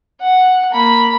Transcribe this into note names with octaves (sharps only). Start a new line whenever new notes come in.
F#5
A#3 B5